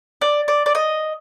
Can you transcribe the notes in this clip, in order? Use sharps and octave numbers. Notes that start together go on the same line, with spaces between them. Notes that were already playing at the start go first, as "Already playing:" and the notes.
D5
D5
D5
D#5